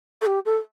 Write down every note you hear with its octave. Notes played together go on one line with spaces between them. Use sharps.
A4
G4
A4